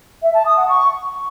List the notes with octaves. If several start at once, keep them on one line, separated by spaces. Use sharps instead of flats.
E5
A5
D#6
F#5
C#6